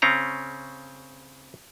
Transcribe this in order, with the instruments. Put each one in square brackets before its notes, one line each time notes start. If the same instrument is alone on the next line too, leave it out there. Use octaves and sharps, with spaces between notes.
[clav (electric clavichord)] C#3 C4 C#4 A#5